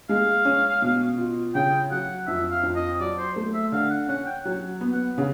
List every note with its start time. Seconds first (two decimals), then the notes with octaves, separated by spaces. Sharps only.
0.09 G#3 F5
0.45 C#4
0.82 B2
1.18 F4
1.55 C#3 G5
1.91 F#3 F#5
2.27 F2 E5
2.51 F5
2.63 F2
2.75 D#5
3.00 F#3 D5
3.18 C5
3.36 A3
3.54 E5
3.72 D3 F5
3.90 F#5
4.08 C#4 F#5
4.26 G5
4.45 F#3 F#5
4.81 B3
4.93 F#5
5.18 C#3